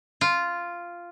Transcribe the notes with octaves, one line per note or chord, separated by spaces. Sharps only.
F4